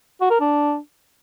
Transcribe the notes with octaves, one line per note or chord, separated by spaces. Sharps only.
F#4
A#4
D4